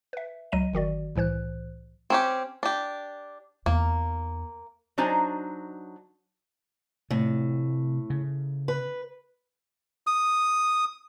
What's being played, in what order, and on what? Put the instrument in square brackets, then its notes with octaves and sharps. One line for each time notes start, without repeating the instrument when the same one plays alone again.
[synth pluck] B4 E5
C#2 F#3 D#5 D#7
G1 D#3 F#4 D5
C2 A2 E3 C5 F#6
[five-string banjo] C4 C#4 G4
D4 G4
[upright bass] E2 D#4 [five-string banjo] A#3
[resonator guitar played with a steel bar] F#3 D4 D#4 C5 G#5
[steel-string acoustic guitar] A2 [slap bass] C3 A3
[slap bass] C#3
[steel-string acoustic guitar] B4
[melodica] D#6